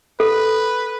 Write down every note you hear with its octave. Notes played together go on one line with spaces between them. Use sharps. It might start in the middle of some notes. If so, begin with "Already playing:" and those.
A4 B4